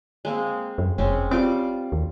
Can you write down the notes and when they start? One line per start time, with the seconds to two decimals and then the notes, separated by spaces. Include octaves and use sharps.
0.25 G#3 A#3 C4
0.78 F#2
0.98 F1 G#3 C4 C#4
1.31 G3 C4 F4 D6
1.92 D#2